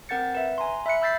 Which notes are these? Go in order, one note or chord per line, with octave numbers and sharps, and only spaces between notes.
C4 A#4 F#5 G6 A6 C#7
B4 E5
G#5 A#5 C6
E5 B5 F#6 C#7
B5 E6 G6 A6 B6 C7